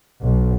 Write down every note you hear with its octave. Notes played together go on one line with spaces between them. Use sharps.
B1